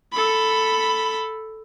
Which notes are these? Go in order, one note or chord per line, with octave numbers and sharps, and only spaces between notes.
A4 B5